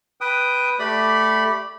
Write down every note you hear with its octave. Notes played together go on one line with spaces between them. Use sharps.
B4 G5 D#6
A3 G4 D5 B5